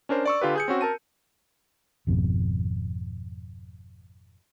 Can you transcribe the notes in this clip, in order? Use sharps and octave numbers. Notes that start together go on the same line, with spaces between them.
C#4 D4 A#4 C5
D5 C#6 E6
D3 F4 G4 B4
G#4 G6 C#7
C4 C#4 F#4
A#4 A5 D#7
G#1 F2 B2